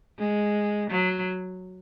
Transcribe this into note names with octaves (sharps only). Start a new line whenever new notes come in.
G#3
F#3